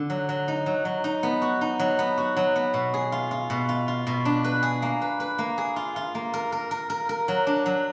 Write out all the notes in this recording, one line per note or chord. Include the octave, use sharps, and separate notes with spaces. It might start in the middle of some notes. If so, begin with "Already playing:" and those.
Already playing: D3
F#3
F#3
D#4
F#3
F#3
D#4
B3
F#4
D#4
F#3
B3
F#4
F#3
B3
B2
G#4
F4
F4
B2
F4
F4
B2
D4
B4
G#4
A#3
B4
B4
A#3
G#4
F4
F4
A#3
A#4
A#4
A#4
A#4
A#4
F#3
D4
F#3